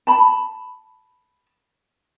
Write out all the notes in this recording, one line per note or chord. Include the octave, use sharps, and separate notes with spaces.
A5 B5